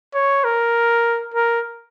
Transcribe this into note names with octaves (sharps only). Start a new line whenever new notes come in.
C#5
A#4
A#4